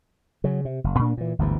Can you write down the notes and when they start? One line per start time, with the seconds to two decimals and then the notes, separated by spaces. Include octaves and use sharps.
0.44 C#3 F#3
0.65 C3
0.84 F#1
0.99 A#2 A#3 C4 D4
1.17 A#2 E3
1.39 G1 D2 G#2 E3